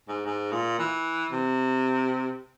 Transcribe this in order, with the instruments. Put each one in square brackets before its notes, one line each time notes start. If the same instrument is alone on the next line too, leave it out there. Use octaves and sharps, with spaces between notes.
[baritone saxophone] G#2
G#2
A#2
E3
C3